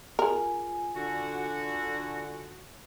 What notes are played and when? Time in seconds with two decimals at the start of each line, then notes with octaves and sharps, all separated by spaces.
0.19 F4 G#4 A#4 G#5
0.96 D3 F#4